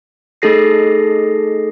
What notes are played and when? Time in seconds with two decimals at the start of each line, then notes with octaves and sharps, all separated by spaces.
0.42 A3 D#4 G#4 A4 A#6 C7